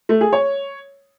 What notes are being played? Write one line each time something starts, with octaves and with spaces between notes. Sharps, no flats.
A3
G#4
C#5